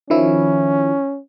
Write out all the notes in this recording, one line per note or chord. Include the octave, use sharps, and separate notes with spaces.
D#3 F3 C#4 E4